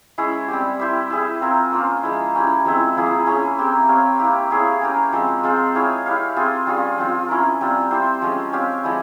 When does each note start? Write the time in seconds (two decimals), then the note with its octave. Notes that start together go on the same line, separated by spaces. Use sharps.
0.18 G#3 C#4 E4
0.48 G3 C4 G4
0.80 E4 G4 C5 E5
1.10 E4 G#4 E5
1.41 C4 F4 A#4
1.72 A#3 C#4 F4 C5
2.03 F3 G#3 E4
2.35 C#4 E4 G4
2.65 F3 G#3 C4 E4
2.97 F3 A#3 E4 G#4
3.27 C#4 E4 G#4 C#5
3.59 C4 G4 A#4
3.88 C4 G4 C#5 F5
4.19 A#3 E4 G4
4.51 E4 G#4 C#5 F5
4.81 C#4 G4 A#4
5.13 F3 G#3 C4
5.43 G#3 C4 F4 C5
5.75 E4 G#4 C#5 F5
6.06 E4 G4 C#5 F5
6.36 C4 F4 G#4
6.67 G3 C#4 F4 G#4
6.98 F3 C4 F4
7.29 C#4 E4 A#4
7.61 G3 C4 F4
7.91 C4 E4 G4 C5
8.22 F3 G#3 C#4
8.52 C4 G4 C#5 F5
8.84 F3 G#3 E4